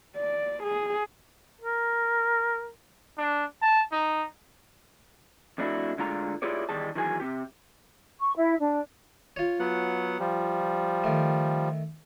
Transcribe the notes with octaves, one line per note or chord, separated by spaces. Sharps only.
D5
G#4
A#4
D4
A5
D#4
F2 A3 D4 E4 F#4
D2 D3 G#3 F4 A#5
E4 F4 G4 G#4 C#5 D5
E2 D#3 G3 G#4 A5
D#3 E3 F#3 G#4 B4 G#5
C3 G4
C#6
E4
D4
F4 C#5
F#3 B3 F#5
F3 G3
D#3 A3